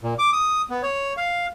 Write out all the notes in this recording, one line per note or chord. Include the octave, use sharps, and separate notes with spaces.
A#2
D6
D#6
B3
C#5
F5